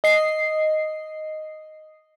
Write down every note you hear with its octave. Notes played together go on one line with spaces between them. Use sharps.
D#5 C7